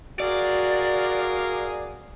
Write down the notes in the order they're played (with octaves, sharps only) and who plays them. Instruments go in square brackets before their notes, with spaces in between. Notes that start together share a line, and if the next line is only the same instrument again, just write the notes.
[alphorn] F#4 [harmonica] G#4 A#4 F5 [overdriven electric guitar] D5